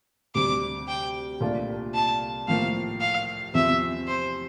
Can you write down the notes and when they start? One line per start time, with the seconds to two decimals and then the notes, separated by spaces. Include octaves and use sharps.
0.35 D2 C3 G3 D6
0.88 G5
1.41 C2 A#2 A3 D4 F4
1.94 A5
2.48 A2 F3 A#3 F5
3.00 F5
3.53 E2 C3 F3 C4 E5
4.08 C5